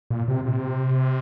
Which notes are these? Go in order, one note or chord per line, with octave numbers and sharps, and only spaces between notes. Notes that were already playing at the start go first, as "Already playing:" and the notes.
A#2
C3
C3